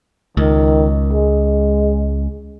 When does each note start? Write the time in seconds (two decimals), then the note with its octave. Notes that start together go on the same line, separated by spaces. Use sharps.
0.37 C#2 D#3
1.13 G#3